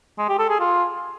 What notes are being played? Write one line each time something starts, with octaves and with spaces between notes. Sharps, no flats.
G#3
G4
A4
G#4
F4